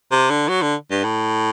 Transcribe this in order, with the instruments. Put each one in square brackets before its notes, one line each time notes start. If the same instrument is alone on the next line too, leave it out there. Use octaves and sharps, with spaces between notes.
[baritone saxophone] C3
D3
F#3
D3
G2
A2